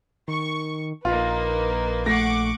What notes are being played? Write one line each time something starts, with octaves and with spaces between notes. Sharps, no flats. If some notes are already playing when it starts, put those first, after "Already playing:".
D#3 C#6
A#1 A#3 D#4 F4 B4
A3 F#5 C#6 D6 A#6 C7